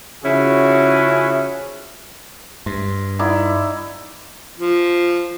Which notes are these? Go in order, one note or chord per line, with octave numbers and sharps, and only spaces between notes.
C#3 F3 C#4 E4 F#4 G#4
G2 C6
D#4 E4 D5 F#5
F3